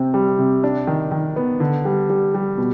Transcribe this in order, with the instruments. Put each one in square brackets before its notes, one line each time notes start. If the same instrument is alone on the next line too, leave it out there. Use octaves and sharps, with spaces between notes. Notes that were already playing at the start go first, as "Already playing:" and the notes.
Already playing: [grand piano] C3 C4
G3
C3
D4
D#3
D#3
B3
D3
G3
G3
G3
B2